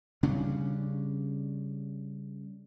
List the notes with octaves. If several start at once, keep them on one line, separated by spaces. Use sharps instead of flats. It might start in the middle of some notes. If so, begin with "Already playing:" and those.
C#3 G3 C#4 D4